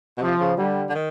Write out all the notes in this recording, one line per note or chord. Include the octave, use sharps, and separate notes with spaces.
B2
C3 F3
C#3
D3 G3
D3
D#3